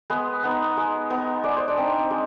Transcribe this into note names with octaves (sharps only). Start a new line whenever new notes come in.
G#3 B3 B4
B3 D#4
G#3
B3 D#4
G#3 D5
C5
D4 D5
C4 D#4
G#3